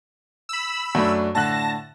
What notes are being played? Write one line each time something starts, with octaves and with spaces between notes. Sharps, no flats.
B5 E6
F#2 A3 D4
A2 D3 A5 F#6 A#6